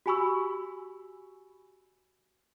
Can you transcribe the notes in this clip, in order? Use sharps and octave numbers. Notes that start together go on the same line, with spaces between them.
F#4 G4 G#5 B5 C#6 E6